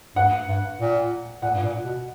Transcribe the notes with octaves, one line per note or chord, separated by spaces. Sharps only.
G2 F#5
G2
A#2
A#2 F#5
G2
A#2
B2